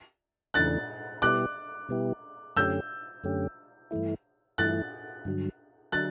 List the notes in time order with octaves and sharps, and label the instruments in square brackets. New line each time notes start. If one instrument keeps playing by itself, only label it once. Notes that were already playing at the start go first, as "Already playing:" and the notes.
[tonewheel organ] E2 C#3 E3 A3 D4 [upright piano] F#6 A6
[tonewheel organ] B2 G3 B3 E4 G4 [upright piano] D6 F#6
[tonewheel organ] B2 G3 B3 E4 G4
[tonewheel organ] F#2 D3 A3 C#4 G4 [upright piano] E6 G6
[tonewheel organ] F#2 D3 A3 C#4 G4
G2 E3 A3 E4
[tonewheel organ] G2 E3 A3 E4 [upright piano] F#6 A6
[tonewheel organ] G2 D3 F#3
[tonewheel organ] D3 F#3 [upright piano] F#6 A6